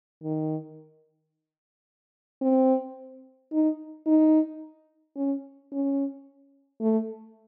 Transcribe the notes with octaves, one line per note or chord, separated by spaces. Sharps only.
D#3
C4
D#4
D#4
C#4
C#4
A3